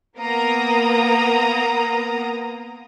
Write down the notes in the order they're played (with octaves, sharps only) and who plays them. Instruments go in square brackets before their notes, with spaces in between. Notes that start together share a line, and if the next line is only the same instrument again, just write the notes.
[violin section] A#3 B3 A#5 D#6